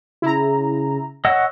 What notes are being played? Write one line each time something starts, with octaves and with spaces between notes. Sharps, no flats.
C#3 E4 A#5
C#5 D#5 F#5 E6